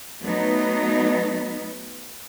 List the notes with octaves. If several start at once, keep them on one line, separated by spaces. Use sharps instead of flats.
F#3 A3 B3 D#4